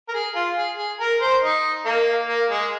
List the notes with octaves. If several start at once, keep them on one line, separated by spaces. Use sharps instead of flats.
A#4
G#4
F4
G#4
G#4
A#4
C5
D#4
A#3
A#3
G#3